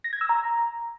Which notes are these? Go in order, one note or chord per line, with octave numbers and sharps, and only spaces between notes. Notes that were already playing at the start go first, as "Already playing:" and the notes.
A#6
G#6
E6
A#5